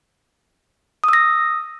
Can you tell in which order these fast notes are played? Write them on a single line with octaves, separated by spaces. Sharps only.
D#6 E6 A#6